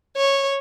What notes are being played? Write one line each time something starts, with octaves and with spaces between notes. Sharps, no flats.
C#5